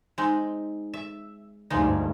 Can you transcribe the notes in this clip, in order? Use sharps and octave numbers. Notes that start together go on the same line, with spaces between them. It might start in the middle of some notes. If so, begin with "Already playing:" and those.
G#3 C4 D#4
E5
D2 G2 F3 G#3 D#4